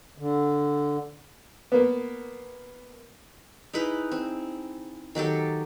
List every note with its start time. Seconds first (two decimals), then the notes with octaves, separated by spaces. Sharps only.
0.18 D3
1.72 A#3 B3
3.73 D#4 E4 G#4 B4
4.12 C4
5.15 D#3 F#3 G4 A4